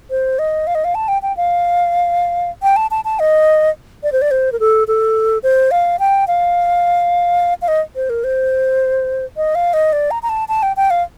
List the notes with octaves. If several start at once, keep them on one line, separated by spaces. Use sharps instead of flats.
C5
D#5
F5
D#5
F5
A5
G5
G5
F5
G5
A5
A5
A5
D#5
D5
C5
D5
C5
A#4
A4
A4
C5
F5
G5
F5
F5
D#5
C5
A#4
C5
D#5
F5
D#5
D5
A#5
A#5
A5
A5
G5
G5
F5